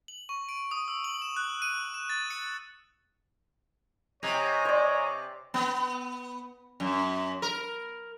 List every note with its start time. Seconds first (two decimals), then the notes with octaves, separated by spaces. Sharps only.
0.08 F#7
0.29 C#6
0.49 D7
0.71 D#6
0.88 E6
1.04 F#7
1.22 E7
1.37 F#6
1.62 D#7
1.94 E7
2.10 A6
2.30 C#7
4.23 C3 C#5 D#5 G#5 A#5
4.65 C5 D5
5.54 B3
6.80 F#2
7.42 A#4